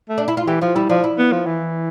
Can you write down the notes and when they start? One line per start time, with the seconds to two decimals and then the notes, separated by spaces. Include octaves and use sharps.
0.09 A3
0.18 D4
0.28 E4
0.37 F4
0.47 E3 G4
0.62 F3 F4
0.76 G3 E4
0.89 F3 D4
1.04 E4
1.18 B3
1.32 F3
1.46 E3